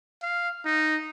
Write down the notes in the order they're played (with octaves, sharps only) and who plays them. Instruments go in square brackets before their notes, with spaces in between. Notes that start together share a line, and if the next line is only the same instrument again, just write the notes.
[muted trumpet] F5
D#4